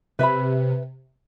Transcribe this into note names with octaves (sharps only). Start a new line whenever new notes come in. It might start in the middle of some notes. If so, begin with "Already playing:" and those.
C3 B4 E5 B5